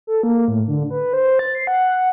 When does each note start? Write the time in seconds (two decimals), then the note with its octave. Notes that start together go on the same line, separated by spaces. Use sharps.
0.07 A4
0.23 A#3
0.48 A2
0.68 D3
0.90 B4
1.13 C5
1.39 A6
1.55 C7
1.67 F#5